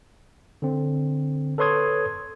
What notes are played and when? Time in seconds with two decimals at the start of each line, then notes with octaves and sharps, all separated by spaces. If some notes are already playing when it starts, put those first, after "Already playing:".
0.62 D3 C4
1.58 A4 B4 C#5 C6 D#6 G#6